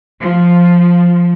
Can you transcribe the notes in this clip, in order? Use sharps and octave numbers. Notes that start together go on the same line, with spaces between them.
F3